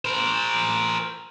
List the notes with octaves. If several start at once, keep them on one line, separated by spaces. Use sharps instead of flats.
A#4 C5